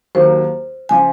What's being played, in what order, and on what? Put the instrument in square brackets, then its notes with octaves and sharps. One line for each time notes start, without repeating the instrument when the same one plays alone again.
[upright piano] D#2 D#3 F#3 A#3 [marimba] C5
[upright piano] C#3 F3 [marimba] G#5